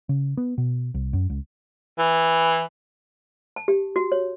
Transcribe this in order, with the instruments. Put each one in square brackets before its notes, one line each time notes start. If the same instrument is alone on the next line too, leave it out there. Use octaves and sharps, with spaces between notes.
[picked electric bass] C#3
B3
B2
C2
F#2
C#2
[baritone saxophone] E3
[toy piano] A5
G4
F#4
C#5